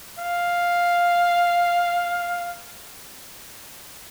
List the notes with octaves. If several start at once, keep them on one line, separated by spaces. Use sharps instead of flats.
F5